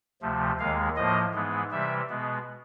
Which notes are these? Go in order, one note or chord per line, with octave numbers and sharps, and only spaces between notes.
D2 C3 F3 A3
D#2 D#3 G#3 F5
A2 F3 A#3 D#5
G#2 E3 G#3 B3
C3 E3 G3 E5
B2 G#3 B3